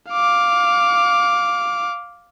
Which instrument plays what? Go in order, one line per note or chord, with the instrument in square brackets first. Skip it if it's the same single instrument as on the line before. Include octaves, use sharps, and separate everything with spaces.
[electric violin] F5 D6